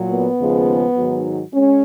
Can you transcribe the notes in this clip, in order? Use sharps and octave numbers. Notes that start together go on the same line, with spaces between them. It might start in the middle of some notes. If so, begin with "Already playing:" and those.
Already playing: A#2 F#3
B3
D#2 C#3 F3 G#3
G#2 D#3 F#3
G#3 C#4